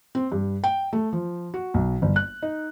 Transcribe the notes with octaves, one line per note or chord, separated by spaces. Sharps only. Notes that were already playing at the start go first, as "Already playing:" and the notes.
C4
G2
G5
A3
F3
F#4
B1
G1
F#6
D#4